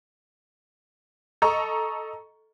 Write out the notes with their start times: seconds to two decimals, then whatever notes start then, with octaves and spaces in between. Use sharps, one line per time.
1.42 A4 D#5 A#5 C#6